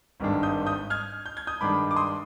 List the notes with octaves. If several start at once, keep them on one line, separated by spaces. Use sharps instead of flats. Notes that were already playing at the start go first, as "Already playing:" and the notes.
G#1 G2 D#3 G#3 D4
D#6 G6
D#6 G6
F6 G#6
G6
G#6
D#6 G6
G2 D#3 G#3 D4 B5 D6
D6
C6 D#6